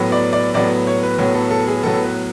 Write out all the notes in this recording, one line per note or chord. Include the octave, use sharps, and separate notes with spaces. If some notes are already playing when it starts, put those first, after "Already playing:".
Already playing: A2 F#3 B3
D5
D5
A2 F#3 B3 D5
C#5
B4
A2 F#3 B3
A4
A4
G#4
A2 F#3 B3 A4
B4